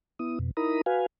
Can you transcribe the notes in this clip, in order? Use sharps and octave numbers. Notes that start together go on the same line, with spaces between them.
B3 E4 D#6
F2 B2
D#4 E4 A#4 A#5 B5 D#6
F#4 B4 F5 G#5